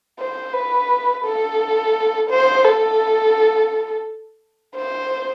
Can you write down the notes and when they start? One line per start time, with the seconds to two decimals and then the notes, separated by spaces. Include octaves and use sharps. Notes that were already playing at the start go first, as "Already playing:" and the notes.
0.19 C5
0.53 B4
1.25 A4
2.30 C5
2.64 A4
4.76 C5